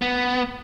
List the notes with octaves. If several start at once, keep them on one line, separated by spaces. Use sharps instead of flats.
B3